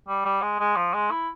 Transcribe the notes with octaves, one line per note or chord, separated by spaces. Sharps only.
G3
G3
G#3
G#3
F3
G#3
E4